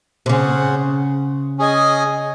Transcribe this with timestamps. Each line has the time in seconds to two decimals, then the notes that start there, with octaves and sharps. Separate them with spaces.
0.26 C3
0.29 C#3 C#4 G#4 C5 F#5
1.59 C#4 G#4 D#5 G#5